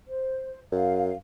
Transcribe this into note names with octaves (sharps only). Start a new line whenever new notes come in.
C5
F#2 F5